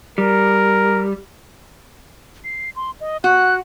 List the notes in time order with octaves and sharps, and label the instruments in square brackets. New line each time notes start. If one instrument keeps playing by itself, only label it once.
[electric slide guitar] G3 [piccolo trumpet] A#4
[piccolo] C7
C6
D#5
[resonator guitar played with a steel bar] F#4 [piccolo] F#6